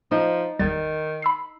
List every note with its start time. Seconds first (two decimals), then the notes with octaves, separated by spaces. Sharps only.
0.11 F3 D#4
0.59 G#1 E2 D#3 G3 A6
1.22 B5 E6 C7